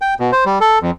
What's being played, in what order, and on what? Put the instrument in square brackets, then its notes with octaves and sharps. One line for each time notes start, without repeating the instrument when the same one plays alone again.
[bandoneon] G5
B2
C5
G3
A4
F2